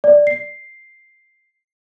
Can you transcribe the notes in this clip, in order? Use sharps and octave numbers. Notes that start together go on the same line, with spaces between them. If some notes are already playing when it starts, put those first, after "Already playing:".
D5
C7